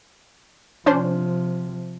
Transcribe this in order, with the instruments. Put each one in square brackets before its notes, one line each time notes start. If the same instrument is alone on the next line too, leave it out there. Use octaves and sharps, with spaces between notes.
[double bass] C3 F3 [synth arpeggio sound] C#4 D4 C5